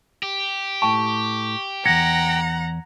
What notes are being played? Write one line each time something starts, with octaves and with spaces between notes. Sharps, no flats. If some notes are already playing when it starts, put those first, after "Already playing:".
G4
A2 G5 A5 C#6
B1 E2 F#5 A#5 G#6 A#6 C#7